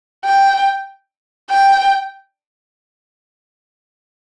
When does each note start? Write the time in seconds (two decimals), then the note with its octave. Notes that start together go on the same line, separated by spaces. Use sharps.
0.25 G5
1.50 G5